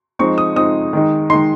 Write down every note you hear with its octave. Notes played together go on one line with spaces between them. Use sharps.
F3 G#3 C4 D#4 C#6
D#6
F3 G#3 C4 D#4 D#6
D#3 G#3 D#4
D#3 G#3 D#4 C6